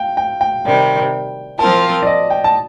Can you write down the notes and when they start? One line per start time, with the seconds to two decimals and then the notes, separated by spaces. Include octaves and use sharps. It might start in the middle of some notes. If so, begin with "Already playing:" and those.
Already playing: F5 G5
0.17 G5
0.41 G5
0.65 C3 D#3 G3
1.59 F3 C4 F4 A#4 A5
2.03 D5
2.07 D#5
2.30 G5
2.44 A5